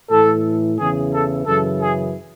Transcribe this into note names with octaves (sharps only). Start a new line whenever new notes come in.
A2 E3 A4
E2 C#3 E3 G#4
A4
F#2 C#3 E3 A4
G#4